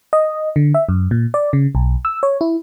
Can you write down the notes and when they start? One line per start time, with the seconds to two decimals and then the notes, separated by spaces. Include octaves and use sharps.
0.13 D#5
0.56 D3
0.74 E5
0.89 F#2
1.11 A#2
1.34 D5
1.53 C#3
1.75 B1
2.05 E6
2.23 C#5
2.41 E4